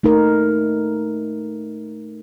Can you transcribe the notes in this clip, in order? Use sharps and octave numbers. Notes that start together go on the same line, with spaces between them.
A3 D#4 A#4